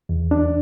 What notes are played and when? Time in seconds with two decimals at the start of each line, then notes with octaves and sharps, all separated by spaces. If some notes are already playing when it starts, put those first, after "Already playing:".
0.09 E2
0.31 D4